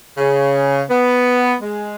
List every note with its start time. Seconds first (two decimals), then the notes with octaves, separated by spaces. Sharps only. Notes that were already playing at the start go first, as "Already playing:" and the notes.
0.18 C#3
0.90 B3
1.62 G#3